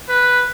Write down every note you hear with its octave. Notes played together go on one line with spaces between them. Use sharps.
B4